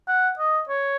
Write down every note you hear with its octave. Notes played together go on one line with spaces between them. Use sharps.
F#5
D#5
C#5